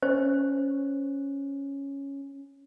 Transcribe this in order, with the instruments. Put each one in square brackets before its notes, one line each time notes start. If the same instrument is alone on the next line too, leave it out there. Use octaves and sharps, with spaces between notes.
[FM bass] C#4 [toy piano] C5